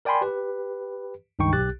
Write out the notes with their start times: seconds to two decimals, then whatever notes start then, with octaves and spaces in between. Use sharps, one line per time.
0.05 A#4 D5 G5 G#5 B5 C6
0.21 G4 B4
1.39 C#2 G2 D#3 D#4 G5 C#6
1.53 B1 G4 F#6 A6